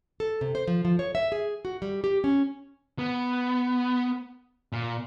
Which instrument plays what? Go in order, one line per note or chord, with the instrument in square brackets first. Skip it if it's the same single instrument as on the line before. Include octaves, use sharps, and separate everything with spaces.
[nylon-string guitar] A4
C3
C5
F3
F3
C#5
E5
G#4
F#4
G3
G4
C#4
[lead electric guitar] B3
A#2